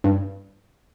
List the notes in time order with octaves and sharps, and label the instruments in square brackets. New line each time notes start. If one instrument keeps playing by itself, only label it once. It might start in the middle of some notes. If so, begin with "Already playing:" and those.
[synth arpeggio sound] G2